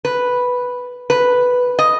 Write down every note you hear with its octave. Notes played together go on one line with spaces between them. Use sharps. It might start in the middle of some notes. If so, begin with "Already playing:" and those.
B4
B4
D#5